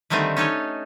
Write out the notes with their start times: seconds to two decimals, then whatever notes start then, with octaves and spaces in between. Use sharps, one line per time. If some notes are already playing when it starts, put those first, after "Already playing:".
0.10 D3 D#3 G3 A3 C4 D#4
0.37 C#4 D#4 A4 C#5